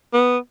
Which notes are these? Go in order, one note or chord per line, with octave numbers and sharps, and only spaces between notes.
B3